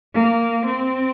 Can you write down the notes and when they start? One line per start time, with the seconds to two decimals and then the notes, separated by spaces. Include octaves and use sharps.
0.14 A#3
0.66 C4